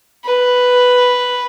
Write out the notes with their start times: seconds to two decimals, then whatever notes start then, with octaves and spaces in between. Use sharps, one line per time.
0.25 B4